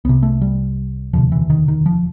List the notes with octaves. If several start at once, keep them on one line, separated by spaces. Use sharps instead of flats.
C2 C3 B3
A3
G3
E1 D2 C3 F3
E3
D#3
D#3
F3